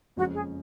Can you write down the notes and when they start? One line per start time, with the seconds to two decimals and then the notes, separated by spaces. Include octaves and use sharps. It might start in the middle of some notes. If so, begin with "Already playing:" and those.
0.17 F#1 F2 F3 G#3 C#4 F#4
0.35 G#4